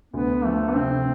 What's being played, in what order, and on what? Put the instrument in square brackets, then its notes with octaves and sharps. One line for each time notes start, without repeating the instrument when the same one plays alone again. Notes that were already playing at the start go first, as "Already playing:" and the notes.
[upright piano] D2 [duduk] B3
[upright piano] F3 [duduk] A3
[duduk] B3
[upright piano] C3 [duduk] C4